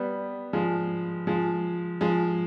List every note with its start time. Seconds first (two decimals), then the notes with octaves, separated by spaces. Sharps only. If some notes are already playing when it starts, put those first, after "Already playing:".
Already playing: G3 B3
0.53 F3 G#3
1.27 F3 G#3
2.01 F3 G#3